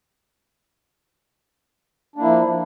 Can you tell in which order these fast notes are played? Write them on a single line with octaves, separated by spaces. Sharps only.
D4 A#3 E4 F3